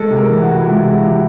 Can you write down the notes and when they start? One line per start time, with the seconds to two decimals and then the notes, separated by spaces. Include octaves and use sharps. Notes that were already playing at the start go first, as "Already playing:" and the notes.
Already playing: G#3 A4
0.11 C3
0.17 A#4
0.29 E3
0.41 F#4
0.47 C#2
0.60 E4
0.66 G#3 F4
0.83 C3
0.90 F#4
1.01 E3 G4